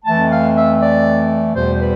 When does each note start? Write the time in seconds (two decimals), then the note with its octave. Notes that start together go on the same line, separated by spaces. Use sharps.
0.05 F2 E3 A3 A5
0.30 F5
0.54 E5
0.79 D5
1.53 E2 B2 G3 C5
1.79 B4